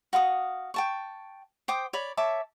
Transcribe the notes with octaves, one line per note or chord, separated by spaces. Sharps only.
F#4 F5 B5 D#6
G5 A5 C#6
C5 G5 D6 D#6
C#5 D5 B5
C#5 E5 A5 D6